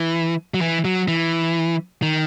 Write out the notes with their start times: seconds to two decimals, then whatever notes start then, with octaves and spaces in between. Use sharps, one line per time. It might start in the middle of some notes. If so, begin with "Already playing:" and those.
Already playing: E3
0.54 F#3
0.61 E3
0.85 F#3
1.08 E3
2.02 D#3